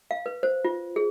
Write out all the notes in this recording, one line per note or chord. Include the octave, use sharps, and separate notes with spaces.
F5
B4
C5
F4
G#4